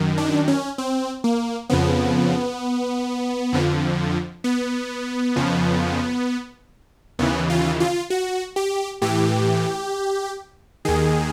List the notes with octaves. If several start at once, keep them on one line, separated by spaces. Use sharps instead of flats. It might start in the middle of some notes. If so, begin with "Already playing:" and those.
Already playing: F#2 D#3
D4
C#4
C4
A#3
F2 C#3 F3 B3
F2 D3 F3
B3
F2 C#3 F3
D#2 C#3 E3 B3
F4
F4
F#4
G4
A2 E3 G4
D#2 D#3 G#4